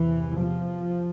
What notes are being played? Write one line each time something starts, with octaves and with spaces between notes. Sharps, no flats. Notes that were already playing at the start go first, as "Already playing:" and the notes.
Already playing: E2 C3 E3
F3